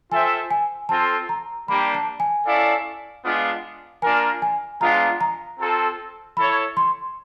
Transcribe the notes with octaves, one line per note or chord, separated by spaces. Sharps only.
F4 A4 C5 E5 G5 G#5
G#5
C4 F4 A4 A5
A#5
G3 A#3 D4 G4 B5
A5
G#5
C#4 E4 A4 D5 F5
G#3 B3 D4 F4
A#3 D4 F4 A#4 G#5
G#5
G#3 B3 D4 F4 A#5
A#5
C4 F4 A4
E4 A4 C#5 B5
C6